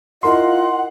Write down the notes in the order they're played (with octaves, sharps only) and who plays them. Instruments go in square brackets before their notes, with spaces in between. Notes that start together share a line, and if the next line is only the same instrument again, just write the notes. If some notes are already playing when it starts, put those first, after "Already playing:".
[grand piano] E4 A#4 C6 [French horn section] F4 D#5 [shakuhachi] F#5